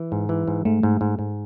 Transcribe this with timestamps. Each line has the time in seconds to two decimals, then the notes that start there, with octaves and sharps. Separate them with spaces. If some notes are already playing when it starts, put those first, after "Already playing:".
Already playing: E3
0.12 G#2
0.29 E3
0.48 G#2
0.65 G#2 A3
0.83 G#2
1.01 G#2
1.19 G#2